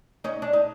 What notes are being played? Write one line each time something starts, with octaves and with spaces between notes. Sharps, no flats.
C#4 D#4
D4
D#4